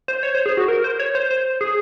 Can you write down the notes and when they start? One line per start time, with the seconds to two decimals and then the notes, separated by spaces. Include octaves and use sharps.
0.08 C5
0.23 C#5
0.35 C5
0.46 G#4
0.57 F#4
0.68 A#4
0.84 C5
1.00 C#5
1.15 C5
1.31 C5
1.61 G#4